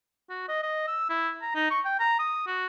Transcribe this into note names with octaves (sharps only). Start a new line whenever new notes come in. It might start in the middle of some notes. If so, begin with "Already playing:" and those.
F#4
D#5
D#5
E6
E4
A#5
D#4
C#6
G5
A#5
D#6
F#4